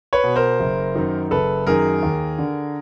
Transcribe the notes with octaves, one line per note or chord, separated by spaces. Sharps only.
B4 C#5
B2
A#4 C5
F#1
F#2 D#3
F#1 A4 B4
F#2 D#3 G#4 A#4
D#2
D3